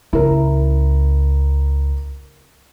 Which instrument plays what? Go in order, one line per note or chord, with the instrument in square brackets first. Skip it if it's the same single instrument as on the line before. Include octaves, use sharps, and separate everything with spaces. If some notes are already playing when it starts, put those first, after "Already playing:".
[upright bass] C#2 [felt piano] E4 A#4